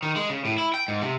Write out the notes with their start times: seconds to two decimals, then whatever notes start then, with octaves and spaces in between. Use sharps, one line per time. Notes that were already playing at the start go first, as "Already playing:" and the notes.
0.03 D#3
0.16 G#3
0.30 C#3
0.45 A2
0.58 E4
0.74 G5
0.88 G#2
1.02 C3